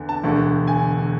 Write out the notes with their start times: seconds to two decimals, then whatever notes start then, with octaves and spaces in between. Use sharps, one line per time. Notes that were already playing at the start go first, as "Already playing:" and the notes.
Already playing: E2 D3
0.09 A5
0.23 E1 D2 D3
0.67 G#5